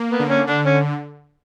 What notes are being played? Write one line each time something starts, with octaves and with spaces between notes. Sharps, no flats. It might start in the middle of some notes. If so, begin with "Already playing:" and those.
Already playing: A#3
B3
D3
C#4
D3 D4
C#4